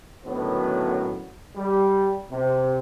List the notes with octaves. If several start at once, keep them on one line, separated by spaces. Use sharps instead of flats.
F#2 A2 D3 D#3 F#3 B3
G3
C3